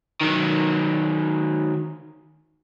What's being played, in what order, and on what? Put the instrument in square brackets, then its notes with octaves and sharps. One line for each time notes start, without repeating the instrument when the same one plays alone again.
[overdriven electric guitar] D#3 F#3